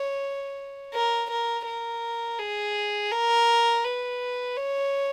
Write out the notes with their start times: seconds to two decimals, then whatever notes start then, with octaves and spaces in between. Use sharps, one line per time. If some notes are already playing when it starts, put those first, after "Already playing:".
Already playing: C#5
0.94 A#4
1.30 A#4
1.66 A#4
2.39 G#4
3.12 A#4
3.84 B4
4.57 C#5